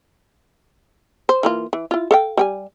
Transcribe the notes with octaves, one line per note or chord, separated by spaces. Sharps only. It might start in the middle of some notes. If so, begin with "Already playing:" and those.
C5
E3 A#3 F4
E3
E4 F4
A4 F5 G5
G3 G5 G#5